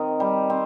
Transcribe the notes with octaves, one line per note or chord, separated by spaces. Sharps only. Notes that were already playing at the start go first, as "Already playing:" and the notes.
Already playing: D#3 C4 A#4 D#5
G3
C4